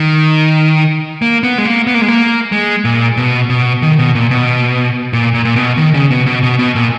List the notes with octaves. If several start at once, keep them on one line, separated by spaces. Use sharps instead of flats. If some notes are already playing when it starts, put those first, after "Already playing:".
Already playing: D#3
A#3
B3
G#3
A#3
B3
A#3
G#3
A#3
G#3
A#2
B2
B2
D#3
B2
A#2
B2
A#2
A#2
A#2
B2
D#3
C#3
B2
B2
B2
B2
A#2